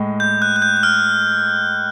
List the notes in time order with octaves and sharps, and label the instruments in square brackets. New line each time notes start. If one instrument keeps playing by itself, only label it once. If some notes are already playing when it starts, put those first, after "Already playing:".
Already playing: [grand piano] A2 G#3
[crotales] G6
F#6
F#6
G6
F#6
F6